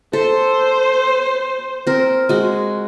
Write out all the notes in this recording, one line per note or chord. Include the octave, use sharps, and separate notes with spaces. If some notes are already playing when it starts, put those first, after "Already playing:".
A4 C5
C4 A#4
G#3 F#4